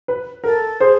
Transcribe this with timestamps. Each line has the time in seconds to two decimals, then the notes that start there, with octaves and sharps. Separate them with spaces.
0.08 B4
0.44 A4 A#4
0.80 G#4 C5